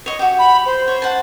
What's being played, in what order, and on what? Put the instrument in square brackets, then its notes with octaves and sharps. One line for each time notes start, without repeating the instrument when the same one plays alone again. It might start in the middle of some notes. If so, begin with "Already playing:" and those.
[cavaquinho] C#5 D#5
F#4 G4
[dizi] B5
C5
[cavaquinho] C#5
F#5 A5